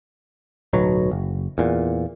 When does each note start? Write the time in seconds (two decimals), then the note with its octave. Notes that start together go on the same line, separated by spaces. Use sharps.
0.73 D1 B1 B2 F#3
1.11 F#1
1.58 E2 A#2